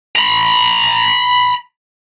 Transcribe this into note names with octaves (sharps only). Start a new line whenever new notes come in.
A#5 B5